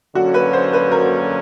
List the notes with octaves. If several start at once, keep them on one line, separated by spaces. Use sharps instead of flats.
D3 F#3 A#3 C#4 F#4
B4
C5
B4
A#4